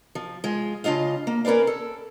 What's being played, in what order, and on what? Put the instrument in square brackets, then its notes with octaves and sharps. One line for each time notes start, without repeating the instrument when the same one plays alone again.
[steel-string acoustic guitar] F3
G#3 F4
C#3 D4 F4 D#5 F5
A#3
C#4 A#4 B4 D5 F5
A4